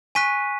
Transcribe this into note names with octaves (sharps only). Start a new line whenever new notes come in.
G#5 C#6 F#6 B6 D#7